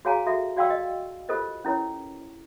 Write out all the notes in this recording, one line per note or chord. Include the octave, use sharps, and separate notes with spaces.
F#4 G#4 C#5 F5 G#5 A#5
F#4 A4 E5
F#4 D5 F5 G5 C6 E6
D#5
F4 G4 A4 A#4 C5 D#5
C#4 E4 A#4 C#5